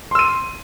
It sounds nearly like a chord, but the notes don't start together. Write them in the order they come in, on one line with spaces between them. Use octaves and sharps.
C6 E6 D#7